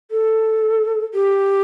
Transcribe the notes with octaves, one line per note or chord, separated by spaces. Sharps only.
A4
G4